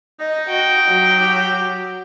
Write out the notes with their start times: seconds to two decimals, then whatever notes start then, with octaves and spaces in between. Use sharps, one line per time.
0.20 D#4 D#5
0.50 F#4 G5
0.89 F#3
1.20 G4